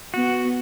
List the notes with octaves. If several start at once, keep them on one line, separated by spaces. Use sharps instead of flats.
B3 F#4